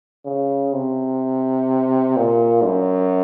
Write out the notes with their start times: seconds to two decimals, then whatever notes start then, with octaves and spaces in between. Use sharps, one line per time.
0.25 C#3
0.73 C3
2.16 A#2
2.63 F#2